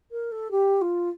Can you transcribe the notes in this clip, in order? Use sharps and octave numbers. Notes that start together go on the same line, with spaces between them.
A#4
A4
G4
F4